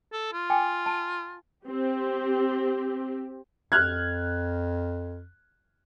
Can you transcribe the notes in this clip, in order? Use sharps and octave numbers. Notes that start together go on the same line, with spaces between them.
A4
F4
G5 G#5 D6
A5
C4 G4
F2 F6 F#6 G#6